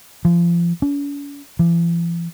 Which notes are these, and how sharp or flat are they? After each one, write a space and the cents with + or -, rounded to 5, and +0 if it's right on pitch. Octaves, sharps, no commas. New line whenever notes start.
F3 -30
C#4 +45
E3 +45